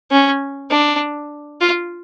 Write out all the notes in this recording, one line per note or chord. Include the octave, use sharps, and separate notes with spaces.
C#4
D4
F4